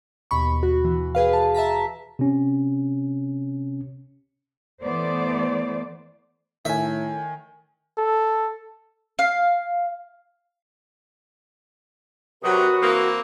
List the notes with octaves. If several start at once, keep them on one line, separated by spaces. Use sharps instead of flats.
D#2 B2 B5 C#6
F#4
E3
G#4 B4 F5
A5
E5 A5 A#5 B6
C3 C#4
E3 A3 B3 C5 D5
A2 D#3 E5 G#5
A4
F5
C3 F#3 F#4 A#4 B4 D#6
E3 A#3 C4